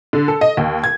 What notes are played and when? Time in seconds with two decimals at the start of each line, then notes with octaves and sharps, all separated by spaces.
0.13 D3
0.28 A4
0.41 D#5
0.57 D#2
0.84 G#6